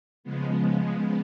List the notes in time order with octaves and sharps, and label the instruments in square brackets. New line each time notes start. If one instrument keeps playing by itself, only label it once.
[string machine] C#3 F3 G#3 B3